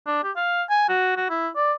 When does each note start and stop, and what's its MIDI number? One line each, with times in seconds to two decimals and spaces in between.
0.07 0.23 62
0.24 0.31 67
0.36 0.63 77
0.70 0.84 80
0.89 1.13 66
1.17 1.26 66
1.30 1.49 64
1.56 1.73 74